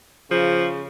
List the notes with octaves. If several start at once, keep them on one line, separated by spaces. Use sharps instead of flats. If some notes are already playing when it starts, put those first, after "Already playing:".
C#3 F3